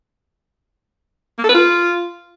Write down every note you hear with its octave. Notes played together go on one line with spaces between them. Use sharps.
A#3
A4
B4
F4